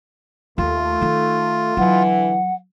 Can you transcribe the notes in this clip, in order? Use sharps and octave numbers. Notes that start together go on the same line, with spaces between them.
D#2 A3 F4
D#3 D#4
D3 E3 F#3 F#5